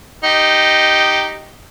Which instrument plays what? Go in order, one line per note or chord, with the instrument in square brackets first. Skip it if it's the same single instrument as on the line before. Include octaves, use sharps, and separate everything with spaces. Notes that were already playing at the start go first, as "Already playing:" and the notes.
[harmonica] D#4 G4